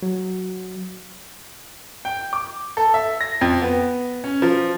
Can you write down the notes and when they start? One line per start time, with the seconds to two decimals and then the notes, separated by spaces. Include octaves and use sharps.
0.02 F#3
2.05 G5
2.33 D6
2.77 A4
2.94 E5
3.21 A#6
3.41 F2
3.62 B3
4.24 C#4
4.42 F3